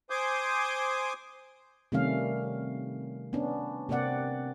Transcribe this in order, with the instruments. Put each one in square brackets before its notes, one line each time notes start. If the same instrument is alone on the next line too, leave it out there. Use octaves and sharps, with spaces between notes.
[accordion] C5 G#5 C6 D6 D#6 G6
[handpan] C3 D#3 G3 A3 C#4 F5
B3 C#4 D4
C3 A#3 C4 D5 F#5